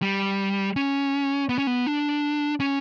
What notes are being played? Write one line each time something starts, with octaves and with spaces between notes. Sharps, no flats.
G3
C#4
B3
C#4
B3
D4
C#4